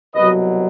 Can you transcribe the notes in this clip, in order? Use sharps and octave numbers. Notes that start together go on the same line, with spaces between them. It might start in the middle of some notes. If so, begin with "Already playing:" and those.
C2 B2 F#3 B4 D#5